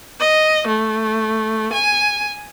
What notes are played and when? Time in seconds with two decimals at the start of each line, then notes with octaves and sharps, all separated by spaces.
0.20 D#5
0.68 A3
1.73 G#5